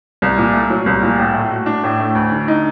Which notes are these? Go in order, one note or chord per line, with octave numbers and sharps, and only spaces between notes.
C2
A#2
A3
F#3
C2
A#2
A2
A3
F#4
D4
A2
A3
D2
D3
D#4